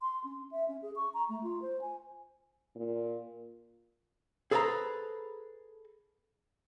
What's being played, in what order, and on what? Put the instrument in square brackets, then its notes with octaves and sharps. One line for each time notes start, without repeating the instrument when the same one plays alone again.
[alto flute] C6
C#4
E5
C#4
G#4
C#6
A#5
A3
F4
C5
G#5
[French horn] A#2
[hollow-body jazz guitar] G#4 A4 B4 C5 F#5 A#5